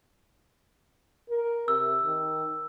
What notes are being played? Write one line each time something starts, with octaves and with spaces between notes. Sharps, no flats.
A#4
C3 E6
D#3